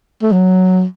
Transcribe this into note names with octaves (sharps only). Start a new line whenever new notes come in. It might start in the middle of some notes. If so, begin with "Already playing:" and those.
A3
F#3